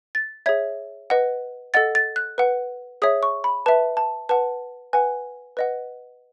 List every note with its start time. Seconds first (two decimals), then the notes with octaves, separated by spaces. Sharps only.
0.15 A6
0.46 G#4 C#5 E5 G#6
1.10 B4 D#5 F#5
1.74 A4 D#5 F#5 A6
1.95 A6
2.16 F#6
2.38 B4 F#5
3.02 G#4 C#5 E5 D#6
3.23 C#6
3.44 B5
3.66 B4 E5 A5
3.97 A5
4.29 B4 F#5 A5
4.93 B4 F#5 G#5
5.57 B4 D#5 F#5